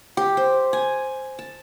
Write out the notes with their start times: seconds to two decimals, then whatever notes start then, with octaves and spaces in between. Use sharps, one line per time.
0.17 G4
0.37 C5
0.73 G#5
1.39 A5